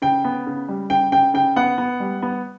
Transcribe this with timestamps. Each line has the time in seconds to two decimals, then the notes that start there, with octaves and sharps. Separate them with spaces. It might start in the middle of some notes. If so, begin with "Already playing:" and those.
0.02 C#3 G5
0.24 B3
0.46 C#3
0.68 G3
0.90 C#3 G5
1.12 C#3 G5
1.34 C#3 G5
1.56 B3 F#5
1.78 B3
2.00 G3
2.22 B3